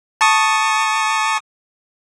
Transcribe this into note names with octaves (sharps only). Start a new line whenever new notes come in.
A5 C#6 D#6